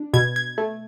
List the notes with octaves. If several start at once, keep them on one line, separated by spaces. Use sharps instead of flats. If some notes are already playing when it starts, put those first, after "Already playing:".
Already playing: D4
B2 G#6
G#6
A3